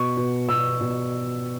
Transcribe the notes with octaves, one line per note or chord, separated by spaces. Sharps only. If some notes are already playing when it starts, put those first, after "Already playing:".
Already playing: B2 C#6
B2
B2 E6
B2